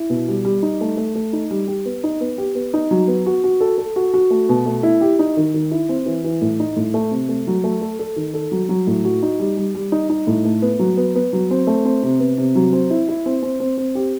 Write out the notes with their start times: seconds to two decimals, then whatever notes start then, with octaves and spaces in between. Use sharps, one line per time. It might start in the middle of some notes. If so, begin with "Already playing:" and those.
Already playing: E4
0.10 B2
0.28 G3
0.45 G3
0.63 D#4
0.81 A3
0.97 A3
1.15 A3
1.33 D#4
1.51 G3
1.68 G4
1.86 B3
2.04 D#4
2.21 B3
2.38 G4
2.55 B3
2.74 D#4
2.91 F#3
3.08 B3
3.26 F#4
3.44 F#4
3.61 A4
3.78 A4
3.96 F#4
4.14 F#4
4.30 A3
4.49 B2
4.66 A3
4.83 E4
5.01 G4
5.19 D#4
5.37 D#3
5.54 D#3
5.71 E4
5.89 C4
6.06 E3
6.24 E3
6.41 A2
6.60 D#4
6.76 A2
6.94 A3
7.11 C3
7.29 A3
7.47 F#3
7.64 A3
7.81 A4
7.99 A4
8.16 D#3
8.34 A4
8.52 F#3
8.69 F#3
8.87 A2
9.05 F#4
9.22 D#4
9.39 G3
9.57 G3
9.75 G3
9.92 D#4
10.09 D#4
10.27 A2
10.45 A3
10.62 B3
10.79 F#3
10.97 B3
11.15 B3
11.33 F#3
11.51 C4
11.67 A3
11.85 C4
12.03 C3
12.20 B3
12.38 C3
12.55 F#3
12.73 C4
12.90 E4
13.09 E4
13.26 C4
13.42 C4
13.60 C4
13.78 C4
13.95 G4